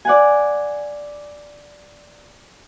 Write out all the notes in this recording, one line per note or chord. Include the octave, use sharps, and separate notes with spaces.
D5 F#5 G#5